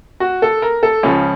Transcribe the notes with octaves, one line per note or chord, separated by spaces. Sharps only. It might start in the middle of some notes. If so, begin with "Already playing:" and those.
F#4
A4
A#4
A4
C#2 C#3 F3 C#4